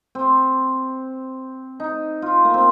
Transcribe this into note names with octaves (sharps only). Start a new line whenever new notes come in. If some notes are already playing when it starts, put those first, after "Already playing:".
C4
D#4
F4
A#3
C4